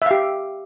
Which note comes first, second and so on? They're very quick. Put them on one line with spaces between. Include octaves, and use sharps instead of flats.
E5 F5 G4